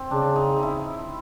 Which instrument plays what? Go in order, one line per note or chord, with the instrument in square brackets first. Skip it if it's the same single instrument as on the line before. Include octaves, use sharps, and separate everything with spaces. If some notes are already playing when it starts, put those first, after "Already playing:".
Already playing: [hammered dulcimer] C4
[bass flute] C#3 [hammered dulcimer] D4
[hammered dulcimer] D#4
D#4
E4